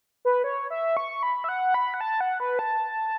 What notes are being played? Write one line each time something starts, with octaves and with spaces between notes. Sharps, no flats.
B4
C#5
E5
C#6
B5
E5
F#5
B5
F#5
A5
F#5
B4
A5